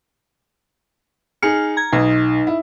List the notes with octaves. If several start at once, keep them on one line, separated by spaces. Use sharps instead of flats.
D#4 G#4 F6 C#7
A#5 G#6
B1 D#4
E4